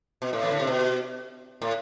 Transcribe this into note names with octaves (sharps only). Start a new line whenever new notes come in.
B2
A2
E3
D3
C3
B2
A2